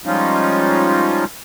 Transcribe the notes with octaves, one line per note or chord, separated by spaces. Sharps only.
F3 G3 G#3 C#4 D#4 F4